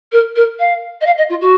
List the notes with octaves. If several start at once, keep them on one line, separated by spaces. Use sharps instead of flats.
A#4
A#4
F5
D#5
F5
D#5
F4
F#4